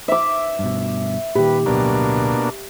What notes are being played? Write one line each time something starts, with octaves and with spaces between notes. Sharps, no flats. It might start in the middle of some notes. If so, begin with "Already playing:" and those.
E5 D6
G2 B2
A#2 D#3 G4 B4
D1 B1 B2 A#3 D4